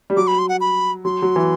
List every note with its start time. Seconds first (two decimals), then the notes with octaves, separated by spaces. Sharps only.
0.10 G3
0.17 F#3 D6
0.27 B5
0.38 C6
0.49 F#5
0.61 B5
1.05 F#3 C6
1.22 F#3
1.36 E3